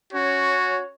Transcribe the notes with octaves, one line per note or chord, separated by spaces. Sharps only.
C#4 F#4 C#5